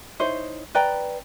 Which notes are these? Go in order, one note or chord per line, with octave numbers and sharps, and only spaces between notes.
D#4 E4 C5 C#5
B4 D5 G5 A#5